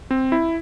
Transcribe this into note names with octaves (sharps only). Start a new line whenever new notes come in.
C4
E4